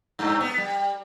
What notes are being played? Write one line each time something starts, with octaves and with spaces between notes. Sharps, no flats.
G2
B3
G3